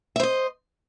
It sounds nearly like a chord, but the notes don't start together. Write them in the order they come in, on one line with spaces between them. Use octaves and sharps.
E5 C5 D#5